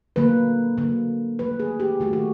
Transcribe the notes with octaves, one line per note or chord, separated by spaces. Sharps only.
D3 F#3 A#3 B4
D3 F#3 A#3
D#3 F#3 A3 B4
G#4
G4
D#3 F#3 A3 F#4
F#4